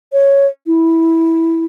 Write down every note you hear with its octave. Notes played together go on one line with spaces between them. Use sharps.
C#5
E4